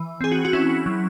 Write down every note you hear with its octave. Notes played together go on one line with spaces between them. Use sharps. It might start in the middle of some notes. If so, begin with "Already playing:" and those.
Already playing: E3
C4 G#4
F#4
F#4
C#4 E4
F#3